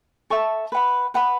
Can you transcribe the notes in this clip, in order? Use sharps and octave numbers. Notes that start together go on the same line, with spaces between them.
A4 E5 A5 C#6
B4 F#5 B5
B4 F#5 B5